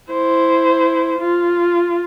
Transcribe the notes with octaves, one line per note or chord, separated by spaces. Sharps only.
E4 C5
F4